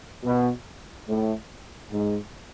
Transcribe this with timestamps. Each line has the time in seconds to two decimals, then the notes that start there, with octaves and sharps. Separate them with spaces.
0.24 B2
1.07 A2
1.91 G#2